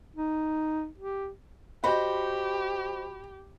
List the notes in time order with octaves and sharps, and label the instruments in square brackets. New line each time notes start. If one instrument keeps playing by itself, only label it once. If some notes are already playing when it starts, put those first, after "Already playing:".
[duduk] D#4
G4
[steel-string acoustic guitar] F#4 C5 D#5 [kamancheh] G4 [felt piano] B5